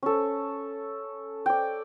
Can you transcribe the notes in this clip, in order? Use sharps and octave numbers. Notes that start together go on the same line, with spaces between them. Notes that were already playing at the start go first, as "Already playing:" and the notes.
C#4 A4
D5 G5